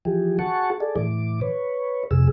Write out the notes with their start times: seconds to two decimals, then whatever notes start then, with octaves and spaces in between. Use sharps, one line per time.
0.05 E3 F3 G4 G#4
0.39 F#4 G#4 F#5 A5 C#6
0.80 G#4 A4 D5
0.96 A2 E3 D6
1.41 B4 C#5
2.11 F2 C3 G#4 E6